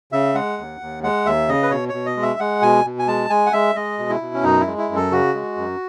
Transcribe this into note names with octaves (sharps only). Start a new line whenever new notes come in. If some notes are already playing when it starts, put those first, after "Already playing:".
C#3 E5
G#3 F#5
D#2
D#2
G#3 F#5
D#2 E5
C#3 D#5
B4
B2 C#5
B2 C#5
D#5
G#3
E5
G#3 F#5
B2 G#5
B2
G#5
G#3 A5
G#3 G#5
F#5
G#3 E5
G#3 D#5
B2
E4
B2
C#4
F#2 D#4
E4
G#3
E4
F#2
A4
C#3 F#4
G#3
F#2